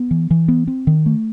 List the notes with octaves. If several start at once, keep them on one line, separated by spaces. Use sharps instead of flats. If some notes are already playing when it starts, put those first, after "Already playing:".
Already playing: B3
E3
E3
B3
C4
D#3
A3